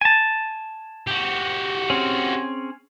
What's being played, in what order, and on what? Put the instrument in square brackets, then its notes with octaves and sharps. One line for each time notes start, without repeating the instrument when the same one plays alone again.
[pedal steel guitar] G#5 A5
[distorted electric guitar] F#4 G4
[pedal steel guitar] C4 C#4 G#4